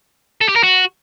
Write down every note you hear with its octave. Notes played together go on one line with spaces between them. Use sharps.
A4
G4
A#4
F#4